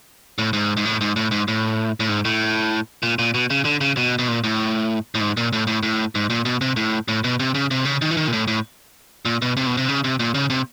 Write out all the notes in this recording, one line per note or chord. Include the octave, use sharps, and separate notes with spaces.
A2
G#2
G#2
A2
G#2
A2
G#2
A2
A2
G#2
A2
A#2
A#2
B2
C#3
D3
C#3
B2
B2
A#2
A2
A2
G#2
A#2
A2
A2
A2
G#2
A#2
B2
C3
A2
A2
B2
C3
C#3
C3
C#3
D#3
E3
D#3
A#2
A2
A2
A#2
B2
C3
B2
C3
C#3
C3
A#2
C#3
C3